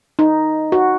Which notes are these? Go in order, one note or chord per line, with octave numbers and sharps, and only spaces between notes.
D#4
F#4